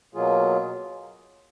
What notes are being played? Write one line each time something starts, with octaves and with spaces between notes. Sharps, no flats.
B2 F#3 A#3 F4 G#4